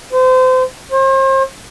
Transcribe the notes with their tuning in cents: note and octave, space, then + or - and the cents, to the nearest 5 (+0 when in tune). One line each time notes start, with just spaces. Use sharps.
C5 -30
C5 +40